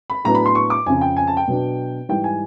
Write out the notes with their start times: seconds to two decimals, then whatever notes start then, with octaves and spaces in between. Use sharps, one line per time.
0.10 B5
0.25 A2 F#3 B3 D4 A#5
0.35 B5
0.46 C6
0.55 C#6
0.70 D6
0.86 F2 C#3 F3 G#5
1.01 G5
1.17 G#5
1.27 A5
1.37 G5
1.48 B2 F#3 B3 D4
2.09 G#2 E3 G3 G5
2.24 G#5